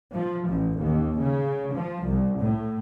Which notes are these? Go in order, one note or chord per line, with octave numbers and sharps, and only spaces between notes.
F3
A1
D#2
C#3
F3
C2
A2